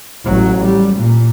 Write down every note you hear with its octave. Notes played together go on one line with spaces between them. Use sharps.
A1 F#3
G3
A#2